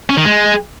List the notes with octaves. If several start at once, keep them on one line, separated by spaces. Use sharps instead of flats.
C#4
D#3
G#3